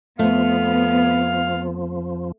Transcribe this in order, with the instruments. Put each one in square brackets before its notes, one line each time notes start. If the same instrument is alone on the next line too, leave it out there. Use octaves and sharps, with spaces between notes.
[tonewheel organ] F2 F3 [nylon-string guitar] A3 [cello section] B3 [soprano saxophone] F5